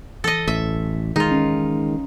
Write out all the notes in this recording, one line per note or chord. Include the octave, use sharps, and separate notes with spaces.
E3 A4 D#5
A1 E5
D#3 G#3 D#4 F4
C#4